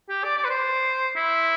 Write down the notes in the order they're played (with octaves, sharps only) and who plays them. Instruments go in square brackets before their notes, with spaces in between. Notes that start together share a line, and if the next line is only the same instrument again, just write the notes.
[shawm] G4
D5
D5
B4
C5
E4